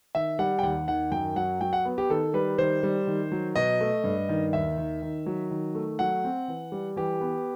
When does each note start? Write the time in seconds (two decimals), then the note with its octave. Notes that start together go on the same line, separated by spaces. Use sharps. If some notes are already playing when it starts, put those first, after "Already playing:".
0.15 D#3 E5
0.39 G3 F#5
0.59 G5
0.63 D#2 F#5
0.87 D#3 F#5
1.11 F#2 G5
1.36 F#3 F#5
1.61 F#3 G5
1.73 F#5
1.85 B3
1.98 G4
2.10 D#3 A4
2.34 G3 B4
2.58 D#3 C5
2.83 G3
3.07 D#3
3.32 F#3
3.56 B2 D#5
3.80 A3
4.04 G2
4.29 D#3
4.53 D#2 E5
4.78 D#3
5.02 D#3
5.26 F#3
5.51 D#3
5.75 A3
5.99 F#3 F#5
6.24 C4
6.48 E3
6.72 G3
6.96 E3 G4
7.21 B3